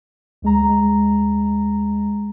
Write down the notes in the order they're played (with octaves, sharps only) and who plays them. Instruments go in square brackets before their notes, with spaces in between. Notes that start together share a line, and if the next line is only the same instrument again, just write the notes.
[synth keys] D2 G#3 A#5